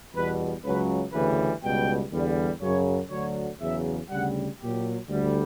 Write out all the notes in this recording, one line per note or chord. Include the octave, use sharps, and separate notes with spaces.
E2 B2 G3 B4
C#2 C#3 F#3 B4
D2 C#3 E3 G3 B4
C#2 B2 G3 G5
E2 D3 G3
F#2 C#3 F#3 C#5
D2 D3 F#3 C#5
E2 C#3 F#3 E5
D2 C#3 G3 F#5
A#2 F#3 G4
D2 D3 G3